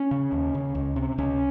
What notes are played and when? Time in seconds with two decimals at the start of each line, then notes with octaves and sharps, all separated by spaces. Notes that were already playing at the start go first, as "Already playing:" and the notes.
Already playing: C#4
0.11 C#3
0.32 D#2
0.54 C#3
0.75 C#2
0.96 C3
1.18 C#2 C#4